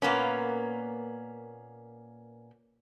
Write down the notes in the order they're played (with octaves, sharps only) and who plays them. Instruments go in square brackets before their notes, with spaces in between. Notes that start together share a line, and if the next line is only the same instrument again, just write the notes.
[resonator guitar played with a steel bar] A#2 A#3 B3 C#4